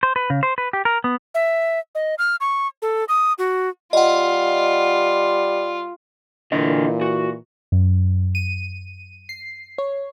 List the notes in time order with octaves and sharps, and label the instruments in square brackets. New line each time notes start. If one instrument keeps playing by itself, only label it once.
[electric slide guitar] C5
B4
C#3
C5
B4
G4
A#4
B3
[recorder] E5
D#5
F6
C#6
A4
D#6
F#4
[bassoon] G3 [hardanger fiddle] F4 [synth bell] D#5 F#5
[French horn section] A#2 E3 [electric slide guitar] D3 D#5
[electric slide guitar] F#4
[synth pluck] F#2
D#7
C7
C#5